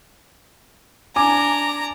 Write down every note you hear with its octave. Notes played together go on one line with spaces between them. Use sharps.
D4 G#5 A#5 D6